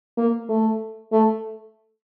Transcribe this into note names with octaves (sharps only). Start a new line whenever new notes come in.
A#3
A3
A3